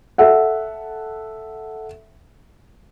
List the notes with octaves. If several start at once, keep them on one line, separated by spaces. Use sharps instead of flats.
A4 E5 F#5